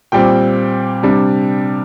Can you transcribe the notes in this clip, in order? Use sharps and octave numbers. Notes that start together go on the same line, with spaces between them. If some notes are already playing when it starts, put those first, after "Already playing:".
A#2 G3 C4 G5
C3 G3 D4